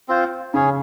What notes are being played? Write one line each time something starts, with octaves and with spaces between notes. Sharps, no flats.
C4 F4 C5
C#3 C#4 G#4 C#5